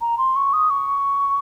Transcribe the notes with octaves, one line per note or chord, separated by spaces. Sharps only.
A#5
C6
C#6
D#6
C#6